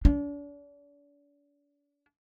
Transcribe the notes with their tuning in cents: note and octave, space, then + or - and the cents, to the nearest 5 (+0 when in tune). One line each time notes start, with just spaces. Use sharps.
D4 -40